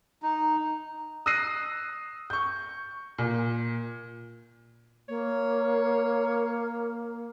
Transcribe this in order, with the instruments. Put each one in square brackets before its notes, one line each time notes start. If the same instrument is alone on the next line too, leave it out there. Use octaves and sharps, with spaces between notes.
[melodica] D#4
[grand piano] D#6 E6 F#6 A#6 C7 D#7
C#6 G6
A#2
[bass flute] A#3 [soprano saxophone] C#5